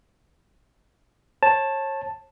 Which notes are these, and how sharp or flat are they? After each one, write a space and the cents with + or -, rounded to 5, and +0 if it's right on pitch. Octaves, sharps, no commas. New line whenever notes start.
C#5 -35 A5 +0